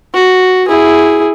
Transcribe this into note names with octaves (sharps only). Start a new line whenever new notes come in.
F#4
E4 G#4